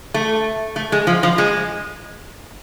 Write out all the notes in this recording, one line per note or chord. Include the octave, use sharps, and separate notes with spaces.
A3
A3
G#3
F3
F3
G#3